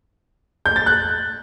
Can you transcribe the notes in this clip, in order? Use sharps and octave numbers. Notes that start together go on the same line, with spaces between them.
G6
A6
F#6